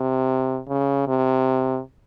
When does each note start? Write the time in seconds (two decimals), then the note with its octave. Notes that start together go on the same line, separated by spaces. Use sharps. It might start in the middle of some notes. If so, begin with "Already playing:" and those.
Already playing: C3
0.68 C#3
1.08 C3